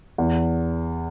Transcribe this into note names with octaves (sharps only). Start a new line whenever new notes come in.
E2